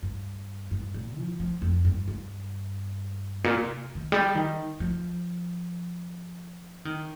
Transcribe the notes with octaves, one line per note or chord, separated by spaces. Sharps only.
G2
G2
A#2
F3
F3
F2
G2
G2
A#2
C3
D#3
G3
D#3
F3
D#3